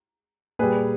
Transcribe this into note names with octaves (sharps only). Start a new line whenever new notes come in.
A#2 G3 G#4 B4